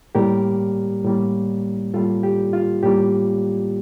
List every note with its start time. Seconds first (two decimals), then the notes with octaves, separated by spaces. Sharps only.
0.15 A2 G3 A#3 G4 A#4
1.04 A2 G3 A#3
1.94 A2 G3 A#3 F4 A4
2.23 G4
2.53 F4
2.83 A2 G3 A#3 G4